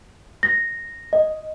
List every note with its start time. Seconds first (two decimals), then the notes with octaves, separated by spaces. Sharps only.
0.43 A#6
1.13 D#5